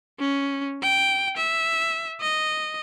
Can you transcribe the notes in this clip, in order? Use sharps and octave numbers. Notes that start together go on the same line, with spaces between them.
C#4
G5
E5
D#5